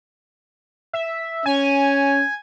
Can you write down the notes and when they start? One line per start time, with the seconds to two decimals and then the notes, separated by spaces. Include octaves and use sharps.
0.93 E5
1.46 C#4 G#5